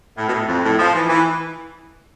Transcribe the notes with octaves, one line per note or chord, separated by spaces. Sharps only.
A2
B2
A2
F2
A2
F3
E3
E3